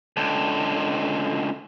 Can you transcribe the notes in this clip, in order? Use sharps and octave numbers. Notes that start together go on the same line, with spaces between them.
C#2 D3